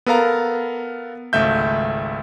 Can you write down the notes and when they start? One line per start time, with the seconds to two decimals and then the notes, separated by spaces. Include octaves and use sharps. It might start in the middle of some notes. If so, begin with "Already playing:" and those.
0.06 B3 A4 A#4 F5 A#5
1.33 G#1 C#2 A3 E5 G6